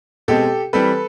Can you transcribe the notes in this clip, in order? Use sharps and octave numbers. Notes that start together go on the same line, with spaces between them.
B2 G#3 C4 G4 A4
E3 G3 C4 A4 B4